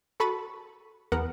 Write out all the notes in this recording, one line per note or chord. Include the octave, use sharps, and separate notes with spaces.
F#4 A4 B5 C#6 A6 D#7
E2 B3 A#4 F#5